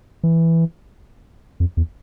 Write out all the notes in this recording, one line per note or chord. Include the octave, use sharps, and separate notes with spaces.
E3
F2
E2